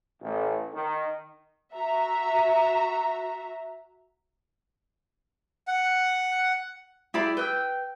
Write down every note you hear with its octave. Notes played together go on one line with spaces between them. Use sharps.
A1
D#3
F#4 E5 A#5
F#5
E4 G4 G#4 D5 B5
B4 G5 B5 E6